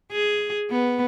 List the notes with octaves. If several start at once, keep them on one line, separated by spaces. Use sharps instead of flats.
G#4
B3